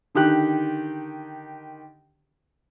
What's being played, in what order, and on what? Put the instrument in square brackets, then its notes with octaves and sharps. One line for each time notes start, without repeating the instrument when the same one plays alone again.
[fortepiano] D3 D#3 G4 F#6